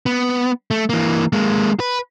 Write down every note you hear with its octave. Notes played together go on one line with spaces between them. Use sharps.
B3
A3
E3 A#3
G#3 A#3
B4